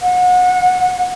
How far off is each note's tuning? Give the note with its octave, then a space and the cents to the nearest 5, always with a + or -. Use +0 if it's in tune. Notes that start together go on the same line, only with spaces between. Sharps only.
F#5 -30